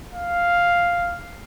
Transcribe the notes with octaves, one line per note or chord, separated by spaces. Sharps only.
F5